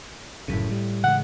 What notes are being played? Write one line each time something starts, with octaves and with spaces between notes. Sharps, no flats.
F1 F#2 A2 C#3 B6 D#7
G3
C#3 E3 G#3 F#5